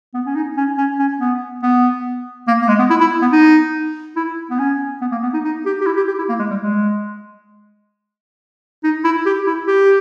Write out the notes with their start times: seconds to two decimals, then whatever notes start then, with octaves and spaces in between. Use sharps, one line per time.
0.14 B3
0.26 C#4
0.35 D#4
0.57 C#4
0.78 C#4
0.99 C#4
1.20 B3
1.63 B3
2.48 A#3
2.62 A#3
2.68 G#3
2.79 B3
2.90 E4
3.00 E4
3.21 B3
3.32 D#4
4.16 E4
4.50 B3
4.59 C#4
5.01 B3
5.12 A#3
5.23 B3
5.33 D#4
5.44 D#4
5.66 G4
5.81 G4
5.86 E4
5.97 G4
6.08 G4
6.18 E4
6.29 A#3
6.39 G#3
6.50 G3
6.61 G#3
8.84 D#4
9.04 E4
9.26 G4
9.47 E4
9.67 G4